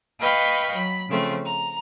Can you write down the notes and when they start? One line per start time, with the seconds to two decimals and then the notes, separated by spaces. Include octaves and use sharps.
0.21 B4 D#5 F5 G5 B5 C#6
0.74 F#3 B5
1.09 C#3 F3 A3 C4
1.45 A#5